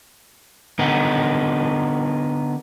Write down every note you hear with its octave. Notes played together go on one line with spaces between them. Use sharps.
D3 B3 D#4